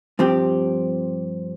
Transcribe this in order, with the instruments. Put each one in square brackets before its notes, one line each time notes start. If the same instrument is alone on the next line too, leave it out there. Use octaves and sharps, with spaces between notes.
[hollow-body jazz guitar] G2 F3 C4 G4